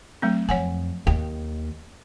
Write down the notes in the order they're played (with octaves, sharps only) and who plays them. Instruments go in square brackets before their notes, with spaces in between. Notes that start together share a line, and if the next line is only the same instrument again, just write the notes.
[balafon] F#3 A3 C4
[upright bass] F2 [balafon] C#5 F#5 G#5
[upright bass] D#2 [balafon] G5